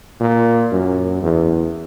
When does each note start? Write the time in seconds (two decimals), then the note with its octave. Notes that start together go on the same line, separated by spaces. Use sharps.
0.20 A#2
0.72 F#2
1.22 E2